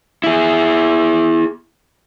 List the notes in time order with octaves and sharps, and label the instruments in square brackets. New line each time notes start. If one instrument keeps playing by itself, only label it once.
[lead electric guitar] E4 G#4